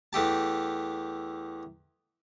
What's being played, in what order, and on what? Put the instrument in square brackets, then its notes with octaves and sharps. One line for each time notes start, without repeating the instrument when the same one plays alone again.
[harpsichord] E2 A3 G4 A5